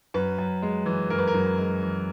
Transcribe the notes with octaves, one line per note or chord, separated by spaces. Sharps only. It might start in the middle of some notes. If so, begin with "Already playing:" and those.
F#2 B4
F#2
G#3
E3
F#2 A#4
B4
A#4
F#2
G#3
E3